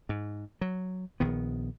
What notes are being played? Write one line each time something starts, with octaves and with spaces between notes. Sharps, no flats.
G#2
F#3
A#1 D#3 B3